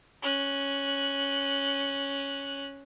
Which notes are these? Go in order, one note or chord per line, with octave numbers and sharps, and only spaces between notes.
C#4 F#6